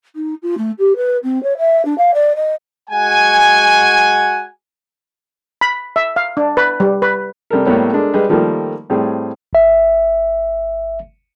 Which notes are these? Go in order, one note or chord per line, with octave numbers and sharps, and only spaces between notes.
D#4
F4
A3
G4
B4
C4
C#5
E5
D4
F5
D5
D#5
G#3 F#4 F#5 G#5
B5
E5
F5
D4
B4
G3
B4
C3 G3 A4 A#4
A2 G3 A#3 B3 A4 C#5
G#3 D4 A4 A#4
G3 G#3 G#4 B4 D#5
D#3 F3 G3 A3 A#3
A2 G3 C4 G#4
G1 E5